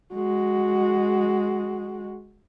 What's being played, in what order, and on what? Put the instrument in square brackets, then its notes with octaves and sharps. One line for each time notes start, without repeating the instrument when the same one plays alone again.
[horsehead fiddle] G#3 F#4